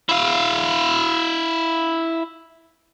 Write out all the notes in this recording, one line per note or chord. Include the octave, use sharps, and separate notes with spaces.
E4 F5